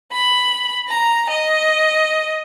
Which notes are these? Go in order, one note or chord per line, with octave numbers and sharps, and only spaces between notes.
B5
A#5
D#5